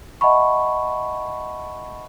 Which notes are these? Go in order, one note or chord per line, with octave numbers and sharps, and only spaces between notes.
D#5 E5 F#5 A5 B5 C#6